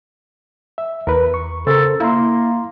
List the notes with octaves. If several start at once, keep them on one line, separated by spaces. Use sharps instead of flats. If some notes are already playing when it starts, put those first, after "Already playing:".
E5
E2 A#4 B4
C#6
C#3 A4 A#4 C5
A#3 E4 F5 A#5 C6